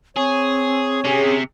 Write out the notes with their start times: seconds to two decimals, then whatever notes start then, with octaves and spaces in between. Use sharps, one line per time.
0.16 C4 G#4 C#5
1.05 C3 C#4 G4 G#4